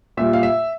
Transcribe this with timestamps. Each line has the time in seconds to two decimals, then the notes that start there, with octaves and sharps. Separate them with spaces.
0.17 A#2 G3 E5
0.33 F5
0.43 E5